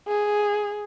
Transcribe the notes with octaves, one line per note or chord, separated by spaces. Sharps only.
G#4